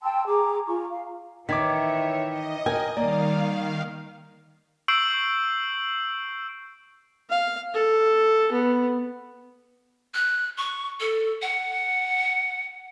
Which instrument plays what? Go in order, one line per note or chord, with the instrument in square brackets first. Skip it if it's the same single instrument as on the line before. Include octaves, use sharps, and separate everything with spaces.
[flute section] G5 A5 C6 E6
G#4 A#5 D6
F4 G#5 A#5 C#6
F5
[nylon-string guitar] D#3 [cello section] E3 C#5 E5 [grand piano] D6 G#6 B6
[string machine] D#5
[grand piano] A#4 G5 [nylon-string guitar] G#5
[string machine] D#3 F5 [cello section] G3 [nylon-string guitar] A#3 [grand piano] D5
[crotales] C#6 E6 G6 C7 D7 F#7
[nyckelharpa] F5
A4
B3
[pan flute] F#6
C#6
A4
F#5